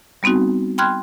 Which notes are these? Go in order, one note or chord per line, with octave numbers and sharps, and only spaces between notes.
G3 B3 C4 D#4 F#4
G5 B5 C6 F6 F#6 G#6